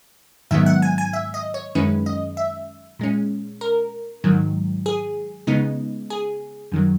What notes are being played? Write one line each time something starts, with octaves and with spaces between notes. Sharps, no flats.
G#2 D#3 F#3 B3 E5
F#5
G#5
G#5
E5
D#5
C#5
F#2 D#3 G#3 C#4 E4 B4
D#5
E5
A#2 G#3 C#4
A#4
G#2 D#3 F#3
G#4
C#3 G#3 B3 D#4
G#4
F#2 D#3 F#3